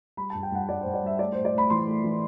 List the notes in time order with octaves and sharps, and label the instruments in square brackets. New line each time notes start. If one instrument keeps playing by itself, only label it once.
[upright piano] G3 B5
G2 A5
G5
G2 F#5
G2 D5
G2 C5
D5
G3 E5
A3 D5
A2 C5
D5
A2 B5
E3 C6
A3
E3